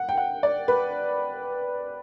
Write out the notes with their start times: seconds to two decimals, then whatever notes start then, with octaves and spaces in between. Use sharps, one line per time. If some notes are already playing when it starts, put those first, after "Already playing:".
Already playing: F#5
0.09 G5
0.17 F#5
0.43 D5
0.68 B4